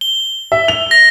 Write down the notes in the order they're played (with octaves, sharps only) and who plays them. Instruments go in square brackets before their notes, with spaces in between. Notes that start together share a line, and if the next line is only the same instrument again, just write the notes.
[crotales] G7
[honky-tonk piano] E5
F7
[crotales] A#6